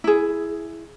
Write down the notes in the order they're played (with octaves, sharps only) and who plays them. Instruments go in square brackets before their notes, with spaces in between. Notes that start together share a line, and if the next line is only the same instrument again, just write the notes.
[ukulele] E4 G#4